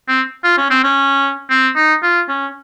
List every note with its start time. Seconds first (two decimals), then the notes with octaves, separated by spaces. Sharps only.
0.09 C4
0.44 F4
0.58 C#4
0.71 C4
0.84 C#4
1.50 C4
1.76 D#4
2.03 F4
2.29 C#4